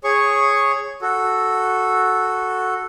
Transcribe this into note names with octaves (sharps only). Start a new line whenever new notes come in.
G#4 C#5 C#6
F#4 A4